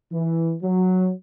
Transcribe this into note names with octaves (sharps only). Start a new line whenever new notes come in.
E3
F#3